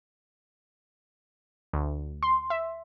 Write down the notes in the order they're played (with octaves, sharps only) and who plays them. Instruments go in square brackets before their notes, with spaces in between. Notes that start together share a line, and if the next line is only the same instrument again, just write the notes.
[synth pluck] D2
C6
E5